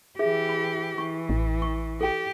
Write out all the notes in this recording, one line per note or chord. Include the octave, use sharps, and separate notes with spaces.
E3 G4 G#4 E5
B5
E3 C#6
A1
C#6
G4 A4 G5